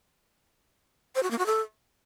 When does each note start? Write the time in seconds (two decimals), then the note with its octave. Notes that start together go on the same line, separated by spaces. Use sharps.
1.15 C5
1.23 F#4
1.31 A#3
1.38 F#4
1.46 A4